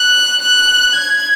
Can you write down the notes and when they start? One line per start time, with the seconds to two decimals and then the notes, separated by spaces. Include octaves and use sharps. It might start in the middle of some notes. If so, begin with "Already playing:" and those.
Already playing: F#6
0.42 F#6
0.93 G#6